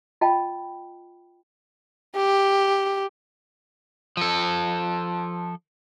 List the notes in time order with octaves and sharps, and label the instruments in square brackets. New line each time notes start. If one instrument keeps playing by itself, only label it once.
[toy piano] F4 D#5 G5 A5 B5
[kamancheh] G4
[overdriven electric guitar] F3 A4